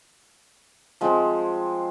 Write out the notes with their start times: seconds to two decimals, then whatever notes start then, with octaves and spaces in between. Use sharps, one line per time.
1.01 F3 G#3 C4